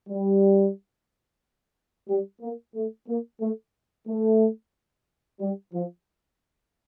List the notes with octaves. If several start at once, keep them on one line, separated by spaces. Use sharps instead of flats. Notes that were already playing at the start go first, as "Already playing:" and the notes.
G3
G3
A#3
A3
A#3
A3
A3
G3
F3